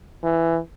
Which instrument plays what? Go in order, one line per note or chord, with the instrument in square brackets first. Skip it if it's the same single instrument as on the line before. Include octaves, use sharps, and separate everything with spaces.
[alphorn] E3